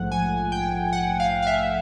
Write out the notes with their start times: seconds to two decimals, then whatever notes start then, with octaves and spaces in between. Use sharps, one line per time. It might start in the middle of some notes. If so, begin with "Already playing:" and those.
Already playing: A#1 G#2 F3 A3 F#5
0.12 G#5
0.52 G5
0.93 F#5
1.20 F5
1.43 F5
1.47 E5